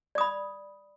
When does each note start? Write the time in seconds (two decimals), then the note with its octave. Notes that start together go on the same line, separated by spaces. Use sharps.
0.15 D5
0.18 D#6
0.21 B5